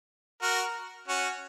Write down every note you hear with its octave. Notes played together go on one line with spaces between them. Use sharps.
F#4 A#4
C#4 F#4